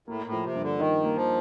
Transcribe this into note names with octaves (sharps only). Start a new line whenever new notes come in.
A2 A#3
A2
F3
C3
G2
D3
D#3 D#4
A#3
F3